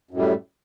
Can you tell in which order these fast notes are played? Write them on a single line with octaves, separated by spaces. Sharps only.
F#2 A2 G3 A3